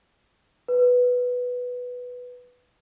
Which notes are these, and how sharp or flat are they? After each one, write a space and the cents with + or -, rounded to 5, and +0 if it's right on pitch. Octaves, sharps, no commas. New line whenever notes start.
B4 +0